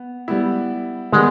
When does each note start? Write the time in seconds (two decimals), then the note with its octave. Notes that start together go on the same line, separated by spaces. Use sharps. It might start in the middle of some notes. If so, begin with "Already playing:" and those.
Already playing: B3
0.28 G3 B3 E4
1.12 D#3 G3 G#3 B3